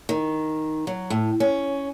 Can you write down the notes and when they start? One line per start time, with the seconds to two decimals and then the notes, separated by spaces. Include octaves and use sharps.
0.09 D#3
0.87 F#3
1.10 A2
1.40 C#4